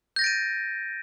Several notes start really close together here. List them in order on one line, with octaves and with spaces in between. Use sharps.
G6 A#6 A6 D7 D#7